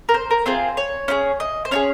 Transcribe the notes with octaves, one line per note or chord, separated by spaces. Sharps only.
A#4
C5
A#4
C4 F4 G#4 C5
C#5
C#4 F4 G#4
D#5
C5
C#4 F4 G#4 C#5